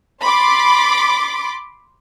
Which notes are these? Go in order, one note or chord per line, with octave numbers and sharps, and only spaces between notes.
B5 C6 D6 A6